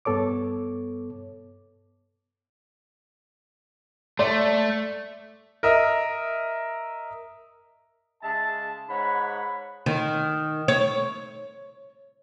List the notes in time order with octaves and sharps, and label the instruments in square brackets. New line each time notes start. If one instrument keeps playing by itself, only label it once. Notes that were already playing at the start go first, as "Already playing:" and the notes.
[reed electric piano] G2 B3 A4 C#5 D6
[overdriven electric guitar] A3 [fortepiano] D5 C6
[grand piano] A#4 D#5 E5
[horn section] C#3 G#3 E5 A5
G#2 C#5 F#5 B5
[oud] D#3
C#5